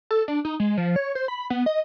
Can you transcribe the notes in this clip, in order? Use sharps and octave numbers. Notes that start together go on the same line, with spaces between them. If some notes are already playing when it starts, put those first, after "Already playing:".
A4
D4
D#4
G#3
F3
C#5
C5
B5
B3
D#5